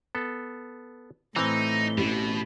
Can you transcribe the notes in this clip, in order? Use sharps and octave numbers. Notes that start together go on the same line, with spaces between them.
B3 A4
A2 E3 C4 D#4
A1 B2